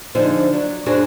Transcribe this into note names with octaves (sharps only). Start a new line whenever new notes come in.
D3 F3 D4 D#4 G#4 C5
F#3 D4
F#2 D4 F#4 G#4 C5